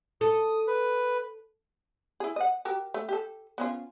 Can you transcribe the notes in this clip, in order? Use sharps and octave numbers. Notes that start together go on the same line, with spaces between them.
A4 D#6
B4
E4 G#4
D#5 F#5
F#4 G4 A#4
A3
G4 A4
B3 C#4 F4